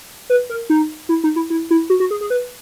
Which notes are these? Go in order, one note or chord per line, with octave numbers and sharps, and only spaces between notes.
B4
A#4
D#4
E4
D#4
E4
E4
E4
F#4
F#4
G#4
G#4
B4